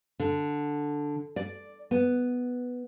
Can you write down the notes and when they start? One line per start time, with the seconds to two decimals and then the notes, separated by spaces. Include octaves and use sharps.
0.20 D3
1.36 D5
1.91 B3